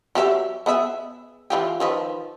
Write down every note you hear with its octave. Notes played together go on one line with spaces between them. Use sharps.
F#3 G4 E5
B3 G#4 E5
E3 F4 G4
D#3 F3 B4